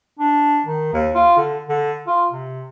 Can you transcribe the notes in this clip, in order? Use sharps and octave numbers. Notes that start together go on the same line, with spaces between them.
D4
D#3
D#2
F4
D3
D3
F4
C3